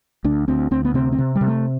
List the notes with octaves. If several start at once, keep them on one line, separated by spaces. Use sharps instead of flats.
D2 D4
D2 C4
D2 C4
B3
C3 C4
C4
C3
G3
C3
A3